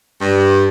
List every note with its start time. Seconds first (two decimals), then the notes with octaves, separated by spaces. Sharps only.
0.21 G2